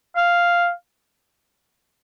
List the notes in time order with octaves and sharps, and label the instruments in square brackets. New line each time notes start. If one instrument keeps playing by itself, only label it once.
[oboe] F5